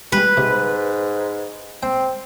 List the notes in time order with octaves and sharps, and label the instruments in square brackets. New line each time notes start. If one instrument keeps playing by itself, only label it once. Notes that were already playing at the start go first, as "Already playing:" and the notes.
[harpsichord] G3 G#3 [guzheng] B4
[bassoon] G#2 [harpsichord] C3
[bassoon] C4 [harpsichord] G5